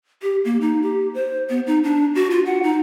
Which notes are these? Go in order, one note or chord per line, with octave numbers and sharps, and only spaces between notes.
G4
A#3
D#4
G4
C5
B3
D#4
D4
F#4
F4
F#5
D#4